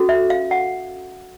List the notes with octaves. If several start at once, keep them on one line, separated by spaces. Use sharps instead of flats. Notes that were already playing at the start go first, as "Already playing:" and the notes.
Already playing: C#4 F#4 A4
E5
F5
F#5